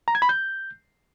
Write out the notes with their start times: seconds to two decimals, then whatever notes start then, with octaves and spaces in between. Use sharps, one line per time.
0.08 A#5
0.15 G#6
0.22 B5
0.29 G6